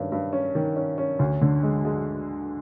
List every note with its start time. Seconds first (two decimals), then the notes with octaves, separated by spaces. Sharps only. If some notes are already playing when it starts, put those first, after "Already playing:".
Already playing: G2 D#3 C#4
0.12 G2
0.33 C#4
0.55 D#3
0.76 C#4
0.98 C#4
1.19 D2
1.41 D3
1.63 G#3
1.85 G#3